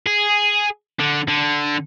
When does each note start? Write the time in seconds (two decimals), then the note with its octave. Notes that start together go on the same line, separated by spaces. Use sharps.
0.06 G#4
1.00 D3
1.28 D3